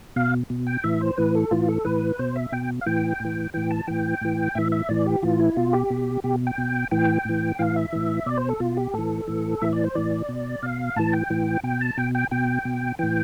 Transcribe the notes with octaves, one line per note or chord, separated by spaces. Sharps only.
B2 F5
B2
G5
A2 E3 E5
C5
A2 E3 B4
A4
A2 E3 F4
A4
A2 E3 B4
B2 C5
E5
B2 G5
F5
A2 E3 G5
A2 E3
A2 E3 G5
A5
A2 E3 G5
A2 E3
A2 E3 E5
E5
A2 E3 D5
G4
A2 E3 F4
E4
B2 F4
G4
B2
B2 G4
G5
B2
A2 E3 G5
A2 E3
A2 E3 F5
E5
A2 E3
B2 D5
C5
A4
B2 F4
G4
A2 E3 A4
A2 E3
A2 E3 E5
D5
C5
A2 E3 D5
B2
B2 F5
A2 E3 A5
G5
A2 E3
B2 G5
A5
B2 G5
G5
B2 G5
B2
A2 E3 G5